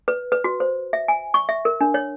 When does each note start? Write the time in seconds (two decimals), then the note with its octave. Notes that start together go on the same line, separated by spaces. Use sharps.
0.08 B4
0.32 B4
0.44 F#4
0.60 C5
0.93 E5
1.08 G#5
1.34 C#6
1.49 E5
1.65 A#4
1.81 D4
1.94 C#5